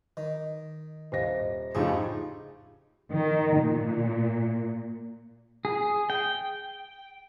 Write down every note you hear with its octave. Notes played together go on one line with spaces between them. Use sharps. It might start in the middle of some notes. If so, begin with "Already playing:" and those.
D#3 D#5
D#1 C5 D#5 F5 A#6
F2 A2 C#3 D#4 F4 G4 G#4
D#3
A#2
G#4
G5